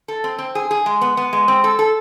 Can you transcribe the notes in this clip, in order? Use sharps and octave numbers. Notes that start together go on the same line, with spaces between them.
A4
C4
C4
G#4
G#4
G#3
B3
B3
G#3
C4
A4
A4